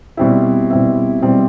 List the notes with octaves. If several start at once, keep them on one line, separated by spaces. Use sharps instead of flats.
B2 G3 C4 E4
B2 G3 C4 E4
B2 G3 C4 E4